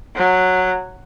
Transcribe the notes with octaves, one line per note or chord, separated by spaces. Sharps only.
F#3